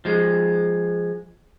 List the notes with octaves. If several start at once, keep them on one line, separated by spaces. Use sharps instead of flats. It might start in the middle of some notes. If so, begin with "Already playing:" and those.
F3 G#3